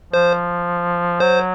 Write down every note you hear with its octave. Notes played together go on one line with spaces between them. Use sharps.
F3 C5
F#3 C5